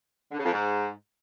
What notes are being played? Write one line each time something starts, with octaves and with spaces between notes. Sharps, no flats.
D3
C#3
F2
G#2